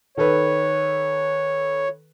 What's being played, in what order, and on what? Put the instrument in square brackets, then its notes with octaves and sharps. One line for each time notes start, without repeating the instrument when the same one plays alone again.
[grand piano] D#3 A4 B4 [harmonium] C#5